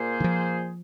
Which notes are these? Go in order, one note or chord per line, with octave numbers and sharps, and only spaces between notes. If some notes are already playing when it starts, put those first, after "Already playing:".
Already playing: A#2 A#3 G#4 C5
D#3
F3